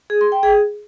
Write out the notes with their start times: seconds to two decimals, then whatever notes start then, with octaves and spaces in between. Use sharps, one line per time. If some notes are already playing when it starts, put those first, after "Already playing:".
0.10 G#4
0.21 C6
0.32 G5
0.43 G#4